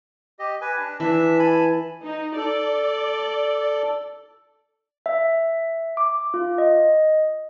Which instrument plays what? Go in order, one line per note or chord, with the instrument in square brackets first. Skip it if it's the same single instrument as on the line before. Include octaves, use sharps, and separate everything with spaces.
[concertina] G4 D#5
B4 G#5
D4
[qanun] E3 [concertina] D4 E5 E6
[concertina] G#5 A5 B5
[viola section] D#4
[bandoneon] A4 [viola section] D5
[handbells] E5
D6
F4
D#5